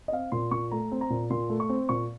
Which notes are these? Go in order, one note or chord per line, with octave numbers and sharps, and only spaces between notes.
D#5
C4 F5
A#2 C6
A#2 C#6
A3 A#5
C4
A#5
A#2
A#2 C6
A3
C#6
C4
A#2 C#6